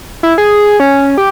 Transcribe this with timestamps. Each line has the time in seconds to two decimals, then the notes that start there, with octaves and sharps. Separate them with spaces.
0.23 E4
0.38 G#4
0.80 C#4
1.18 G4